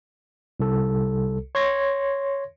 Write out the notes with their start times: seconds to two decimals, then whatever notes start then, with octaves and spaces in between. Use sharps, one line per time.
0.60 C2 A4
1.55 C#5 C6 G#6 A#6